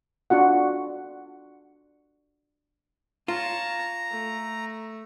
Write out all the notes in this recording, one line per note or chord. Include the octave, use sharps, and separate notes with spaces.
D4 F4 F#4 F#5
F4 C#5 A5 A#5
A3